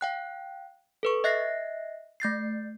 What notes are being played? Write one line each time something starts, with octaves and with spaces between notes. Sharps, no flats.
F5 G5 F#6
A4 B4 C#6
D#5 E5 F#6 A#6 C7
A3 G6 A6 C7